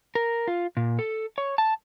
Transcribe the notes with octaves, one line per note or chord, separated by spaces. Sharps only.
A#4
F4
A#2
A4
C#5
A5